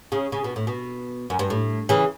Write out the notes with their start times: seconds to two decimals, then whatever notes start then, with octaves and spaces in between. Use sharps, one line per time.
0.12 C#3
0.32 C#3
0.44 B2
0.56 A2
0.67 B2
1.30 F#2
1.39 G2
1.50 A2
1.89 C#3 E3